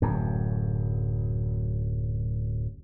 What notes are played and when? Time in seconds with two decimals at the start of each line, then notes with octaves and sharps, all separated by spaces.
0.02 D1 F#2